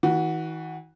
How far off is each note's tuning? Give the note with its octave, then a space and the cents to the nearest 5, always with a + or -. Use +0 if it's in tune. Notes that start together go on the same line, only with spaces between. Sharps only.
E3 -45 F#4 +0